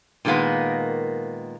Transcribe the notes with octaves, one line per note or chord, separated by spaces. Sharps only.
A#2 D#3 G#3 A#3 B3